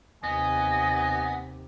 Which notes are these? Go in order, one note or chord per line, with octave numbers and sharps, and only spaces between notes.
D#2 C3 B3 D#5 G#5